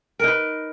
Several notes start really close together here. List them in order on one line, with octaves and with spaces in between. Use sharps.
A#4 D#4 B4